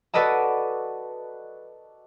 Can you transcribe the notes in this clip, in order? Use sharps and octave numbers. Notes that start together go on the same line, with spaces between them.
F#4 A4 B4 D5 D#5 A5